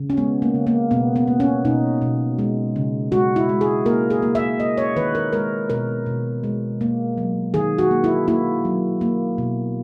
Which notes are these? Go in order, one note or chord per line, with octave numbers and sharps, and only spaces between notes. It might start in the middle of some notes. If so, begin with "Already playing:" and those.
Already playing: C#3
C#4
G#3 B3
A#3
C#3
A#3
B2 B3
B3
A#3
C#4
B2 D#4
B2
G#3
C#3
G#3 F#4
E4
G#3
G#4
A#3 A#4
G#4
A#3
E5
A#3 D#5
C#5
D#3 B4
A#4
G#3 A#4
B2 A#4
B2
G#3
A#3
F#3
D#3 G#4
F#4
A#3
E4
A#3 E4
F#3
A#3
B2